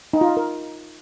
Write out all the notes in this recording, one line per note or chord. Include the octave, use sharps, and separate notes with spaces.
D#4
F4
F5
A#4